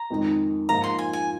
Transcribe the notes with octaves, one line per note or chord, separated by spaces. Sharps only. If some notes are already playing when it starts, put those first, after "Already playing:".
Already playing: A#5
F2 D#3 G#3 D#4
G#2 F3 A#3 F4 A#5
C6
G#5
G#5